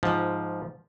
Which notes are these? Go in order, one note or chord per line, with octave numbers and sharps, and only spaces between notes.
G#2 F3